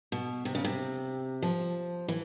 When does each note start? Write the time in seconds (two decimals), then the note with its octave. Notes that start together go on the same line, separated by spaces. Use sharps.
0.12 B2
0.45 C3
0.55 C#3
0.64 C3
1.42 F3
2.08 E3